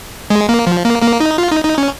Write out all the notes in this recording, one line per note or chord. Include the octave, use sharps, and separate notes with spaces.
G#3
A#3
F3
A#3
A#3
D#4
F4
D#4
D#4
C#4